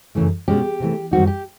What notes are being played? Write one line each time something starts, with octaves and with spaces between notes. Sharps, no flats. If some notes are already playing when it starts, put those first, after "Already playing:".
F#2 C#3 E3 A3
B2 G#3 C#4 G4
C3 E3 A3
F#2 D#3 G3 C4 D#4 F#4
G4